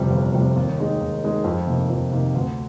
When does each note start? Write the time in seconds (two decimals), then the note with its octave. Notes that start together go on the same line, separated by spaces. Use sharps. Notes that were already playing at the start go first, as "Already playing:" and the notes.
Already playing: G1 F2 C3 G3
0.11 G1
0.33 F2 C3 G3
0.56 D#2
0.78 D#3 G#3 D#4
1.01 D#2
1.23 D#3 G#3 D#4
1.44 F2
1.67 C3 D#3 A#3
1.90 F2
2.11 C3 D#3 A#3
2.35 D2